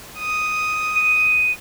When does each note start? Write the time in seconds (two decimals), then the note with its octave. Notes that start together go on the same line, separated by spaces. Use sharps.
0.16 D#6
0.96 D#7